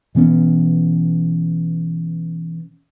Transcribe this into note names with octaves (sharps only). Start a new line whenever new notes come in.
B2 E3 B3 C#4